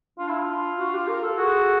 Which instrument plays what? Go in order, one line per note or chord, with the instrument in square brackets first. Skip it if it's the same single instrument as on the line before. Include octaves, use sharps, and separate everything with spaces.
[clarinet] D4 [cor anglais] F4
[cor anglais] E4
F4
[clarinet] F#4
G4
A#4
A4
[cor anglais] F#4 [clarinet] G#4